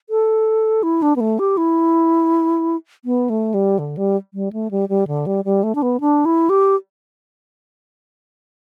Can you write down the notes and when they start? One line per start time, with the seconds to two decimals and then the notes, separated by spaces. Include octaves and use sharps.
0.10 A4
0.83 E4
1.02 D4
1.16 B3
1.20 A3
1.39 G4
1.57 E4
3.05 B3
3.30 A3
3.54 G3
3.79 D3
3.97 G3
4.34 G3
4.53 A3
4.71 G3
4.89 G3
5.07 D3
5.26 G3
5.45 G3
5.63 A3
5.75 D4
5.82 B3
6.00 D4
6.25 E4
6.50 G4